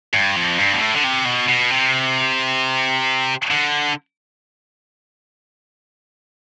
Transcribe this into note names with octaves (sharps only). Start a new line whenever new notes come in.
G2
F2
G2
B2
A2
D3
C3
B2
B2
C3
D3